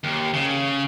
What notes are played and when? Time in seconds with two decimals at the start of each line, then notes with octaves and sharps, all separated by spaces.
0.04 D#2
0.33 C#3